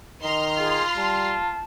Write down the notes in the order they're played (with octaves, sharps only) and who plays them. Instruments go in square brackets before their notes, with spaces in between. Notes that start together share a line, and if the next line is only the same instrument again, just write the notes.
[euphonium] D#3 [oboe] D#5 [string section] A#5 C6 F6
[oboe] F4 [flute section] G#4
[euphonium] G3 [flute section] A5